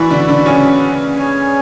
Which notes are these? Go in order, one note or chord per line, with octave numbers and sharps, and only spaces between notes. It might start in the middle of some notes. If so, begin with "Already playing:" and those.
Already playing: E3 E4 F#4 B4 D5
D3 D4
D3 D4
C#3 C#4
C#4 G#4 C#5 G#5